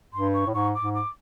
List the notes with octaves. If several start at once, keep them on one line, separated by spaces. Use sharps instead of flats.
G2 C6
C#6
A2
G#2 C#6
D6
G#2
D6